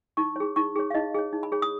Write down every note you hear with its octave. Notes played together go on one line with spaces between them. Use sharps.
D#4 C#6
G#4 C#5
D#4 C#6
G#4 C#5
F5
D#4 D#5
G#4 C#5
D#4
B5
G#4 C#5
D#6